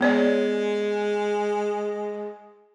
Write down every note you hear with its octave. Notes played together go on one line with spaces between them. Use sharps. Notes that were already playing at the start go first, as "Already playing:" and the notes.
G#3 B3 C#5 D5